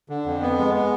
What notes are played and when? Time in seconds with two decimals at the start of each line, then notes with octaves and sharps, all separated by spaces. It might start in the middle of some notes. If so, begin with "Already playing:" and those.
0.09 D3
0.26 F2
0.42 B3
0.59 G#3
0.75 B3